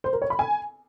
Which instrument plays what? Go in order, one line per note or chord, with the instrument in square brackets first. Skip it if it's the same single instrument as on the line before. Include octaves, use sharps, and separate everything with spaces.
[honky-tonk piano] C5
A#4
C#5
B5
G#5